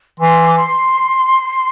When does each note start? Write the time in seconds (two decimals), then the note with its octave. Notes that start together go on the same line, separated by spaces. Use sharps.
0.19 E3 C6
0.45 D6
0.54 C6